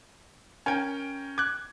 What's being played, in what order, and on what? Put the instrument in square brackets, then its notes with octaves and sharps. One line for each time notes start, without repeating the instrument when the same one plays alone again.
[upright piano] C#4 A#4 G5 [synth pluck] G#5 G#6
[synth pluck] D6 F#6 [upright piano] G#6